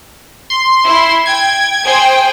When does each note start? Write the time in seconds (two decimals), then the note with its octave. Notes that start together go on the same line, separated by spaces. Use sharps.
0.50 C6
0.84 E4
1.26 G5 G#6
1.84 G#4 C5 G5